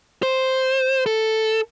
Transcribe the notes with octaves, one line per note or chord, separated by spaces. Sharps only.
C5
A4